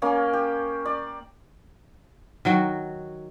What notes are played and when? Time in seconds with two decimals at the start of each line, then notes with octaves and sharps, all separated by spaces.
0.02 A#3 C#4 G#5
0.33 G4
0.85 D5
2.45 D#3 F#3 F#4